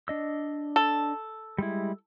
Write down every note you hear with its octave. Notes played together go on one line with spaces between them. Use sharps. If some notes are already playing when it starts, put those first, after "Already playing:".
D4 D#5 E6
A4
G3 G#3 E4